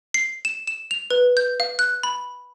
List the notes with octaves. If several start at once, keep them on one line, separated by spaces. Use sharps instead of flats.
C7
E7
E7
F7
B4
G6
F5
F#6
B5